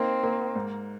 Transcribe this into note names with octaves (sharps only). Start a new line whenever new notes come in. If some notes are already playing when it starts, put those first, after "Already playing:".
Already playing: A#3 C4 D#4
A#3
G#2